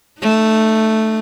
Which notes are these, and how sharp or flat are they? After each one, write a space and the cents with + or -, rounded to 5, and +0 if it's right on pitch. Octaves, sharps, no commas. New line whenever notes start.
A3 +0 D#4 -35